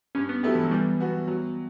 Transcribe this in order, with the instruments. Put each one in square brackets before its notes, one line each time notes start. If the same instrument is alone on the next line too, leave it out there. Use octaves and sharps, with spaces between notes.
[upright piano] G2 [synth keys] C#4
[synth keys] B3
[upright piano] F#3 A3 E4 G4 [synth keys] B3
[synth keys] E3
F#3
[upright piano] E3 [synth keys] G3
[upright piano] B3 F#4
F#3